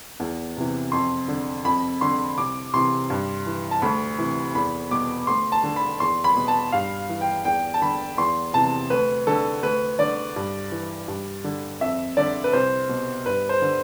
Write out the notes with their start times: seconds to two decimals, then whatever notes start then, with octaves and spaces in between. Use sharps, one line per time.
0.20 E2
0.57 C3 E3
0.92 F2 C6
1.28 D3
1.65 F2 B5
2.01 D3 C6
2.38 C2 D6
2.74 C3 E3 C6
3.10 G2
3.46 E3
3.71 A5
3.82 D2 B5
4.19 C3 E3
4.55 E2 B5
4.91 B2 D6
5.27 D2 C6
5.52 A5
5.63 D3
5.76 B5
6.00 E2 C6
6.24 B5
6.36 B2
6.48 A5
6.72 G2 F5
7.09 E3
7.21 G5
7.45 E2 G5
7.74 A5
7.82 D3 B5
8.18 E2 C6
8.54 C3 E3 A5
8.90 D2 B4
9.27 D3 A4
9.63 D2 B4
9.99 D3 D5
10.36 G2
10.72 E3
11.08 G2
11.44 D3
11.81 F2 E5
12.17 D3 D5
12.44 B4
12.53 C2 C5
12.89 B2
13.26 G2 B4
13.49 C5
13.62 D3